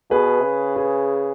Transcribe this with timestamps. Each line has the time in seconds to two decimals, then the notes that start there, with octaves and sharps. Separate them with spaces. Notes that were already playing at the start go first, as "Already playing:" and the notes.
0.10 B2 G#4 B4
0.44 C#3
0.76 G#4 B4